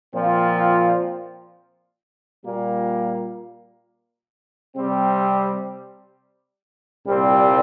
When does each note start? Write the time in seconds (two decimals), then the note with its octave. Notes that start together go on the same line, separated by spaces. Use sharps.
0.14 A#2 F3 C4 F4
2.45 A#2 G3 A#3
4.76 C3 G3 C4
7.06 C2 A#2 G3 C4